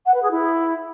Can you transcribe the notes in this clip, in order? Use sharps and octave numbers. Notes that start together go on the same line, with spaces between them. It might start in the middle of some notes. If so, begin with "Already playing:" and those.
F#5
B4
G#4
E4